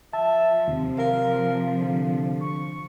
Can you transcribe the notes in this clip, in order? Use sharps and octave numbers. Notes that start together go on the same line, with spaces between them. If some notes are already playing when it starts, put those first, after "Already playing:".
F3 E5 A5
D#2 C3
A#4 F5
D3
C#6